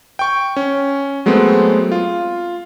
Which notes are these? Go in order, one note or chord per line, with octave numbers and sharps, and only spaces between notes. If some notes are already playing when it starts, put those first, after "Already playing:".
G5 C#6
C#4
F#3 G#3 A3 B3 C4
F4